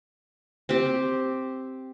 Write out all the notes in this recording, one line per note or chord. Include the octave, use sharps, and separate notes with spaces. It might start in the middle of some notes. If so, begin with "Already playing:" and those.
C4 G4